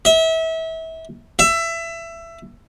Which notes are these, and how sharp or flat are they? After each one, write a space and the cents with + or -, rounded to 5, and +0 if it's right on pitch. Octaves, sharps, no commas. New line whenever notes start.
E5 -30
E5 +20